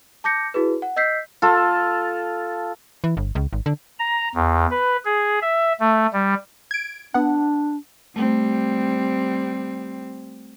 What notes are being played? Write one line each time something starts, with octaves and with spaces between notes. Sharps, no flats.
A5 D6 G6 A#6 C#7
E4 F#4 G#4 B4
F#5
D#5 E6 G6 B6 C7
F4 A4
E3
G1
C#2
G#1
D3
A#5
E2
B4
G#4
E5
A3
G3
G#6 D7
B3 D4 F#5
G3 A3 C4